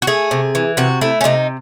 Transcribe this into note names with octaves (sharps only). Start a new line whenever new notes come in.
F#4
A3 G#4
C3
E3
C3 F#4
A3 E4
C#4
C3 D#4